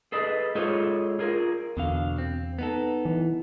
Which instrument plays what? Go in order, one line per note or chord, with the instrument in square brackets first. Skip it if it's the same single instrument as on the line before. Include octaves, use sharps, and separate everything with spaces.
[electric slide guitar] G#4 A4 B4 D#5
G#3 F4 G#4 A4 C5 C#5
F4 G#4 A#4
[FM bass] E2 [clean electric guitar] B2 D3 F5
[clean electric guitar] C4
B3 D#4 A4
[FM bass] E3